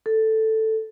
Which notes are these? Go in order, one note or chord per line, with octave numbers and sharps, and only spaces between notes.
A4